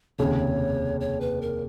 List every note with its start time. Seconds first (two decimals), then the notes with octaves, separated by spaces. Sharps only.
0.19 F1 D#2 C#3 C#5
1.01 C#5
1.21 B4
1.41 A#4